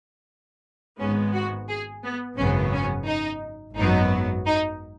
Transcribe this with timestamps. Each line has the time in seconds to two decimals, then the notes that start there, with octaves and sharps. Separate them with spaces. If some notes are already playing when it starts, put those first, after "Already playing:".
0.99 G#1 G#2 G#3 B3 C#4
1.34 F#4
1.69 G#4
2.04 B3
2.37 G#1 F#2 C#3 F#3 B3 C#4
2.73 C#4
3.06 D#4
3.77 G#1 F#2 F#3 B3 D#4
4.46 D#4